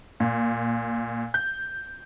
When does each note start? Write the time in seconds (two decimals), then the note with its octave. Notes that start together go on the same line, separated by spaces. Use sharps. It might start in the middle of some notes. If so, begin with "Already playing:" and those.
0.20 A#2
1.34 G6